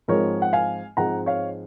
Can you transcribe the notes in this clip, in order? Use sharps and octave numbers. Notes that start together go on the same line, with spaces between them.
G#2 F3 G#3 C4 A#4 C#5
F#5
F5 G#5
G#2 F3 G#3 C4 F#5 A#5
C#5 F5